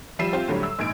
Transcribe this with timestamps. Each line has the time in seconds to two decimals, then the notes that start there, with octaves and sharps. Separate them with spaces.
0.19 F3 G3 E5 C7 D#7 E7
0.33 C4 F4 G4 C5
0.48 A2 D3 F#3 G3
0.63 E6
0.79 A#1 G#2 G#6 D7